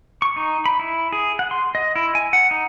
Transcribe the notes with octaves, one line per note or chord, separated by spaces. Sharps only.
C#6
D#4
B5
E4
G#4
F#5
C6
D#5
E4
G#5
F#5
D#4